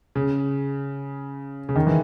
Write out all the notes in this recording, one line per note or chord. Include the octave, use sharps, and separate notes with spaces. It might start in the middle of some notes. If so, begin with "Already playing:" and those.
C#3
C#3
D#3
E3